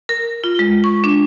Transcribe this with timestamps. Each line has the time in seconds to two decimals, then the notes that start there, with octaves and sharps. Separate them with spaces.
0.09 A#4
0.44 F4
0.59 G#3
0.84 C#6
1.04 D4